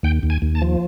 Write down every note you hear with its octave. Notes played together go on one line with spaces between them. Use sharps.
D#2 G5
D#2
G#5
D#2
A5
F3